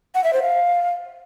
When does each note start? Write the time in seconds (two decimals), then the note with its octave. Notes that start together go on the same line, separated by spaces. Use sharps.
0.15 F#5
0.24 E5
0.33 C5
0.42 F5